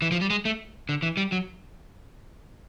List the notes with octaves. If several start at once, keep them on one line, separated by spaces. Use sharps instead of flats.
E3
F3
G3
G#3
A3
D3
E3
G3
F#3